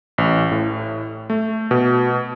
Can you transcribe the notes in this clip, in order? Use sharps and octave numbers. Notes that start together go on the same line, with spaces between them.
A1
A2
A3
B2